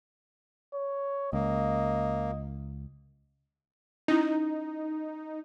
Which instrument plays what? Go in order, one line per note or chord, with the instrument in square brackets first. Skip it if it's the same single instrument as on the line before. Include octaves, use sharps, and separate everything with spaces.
[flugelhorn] C#5
[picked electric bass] C#2 [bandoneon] A#3 [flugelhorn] D#5
[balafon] C#4 E4 [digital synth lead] D#4